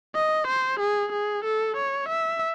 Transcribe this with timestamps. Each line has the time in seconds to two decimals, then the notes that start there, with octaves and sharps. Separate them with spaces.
0.16 D#5
0.47 C5
0.80 G#4
1.12 G#4
1.45 A4
1.77 C#5
2.09 E5